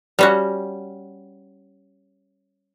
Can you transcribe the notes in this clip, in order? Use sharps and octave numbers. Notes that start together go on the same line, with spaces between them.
G3 C#4 F#4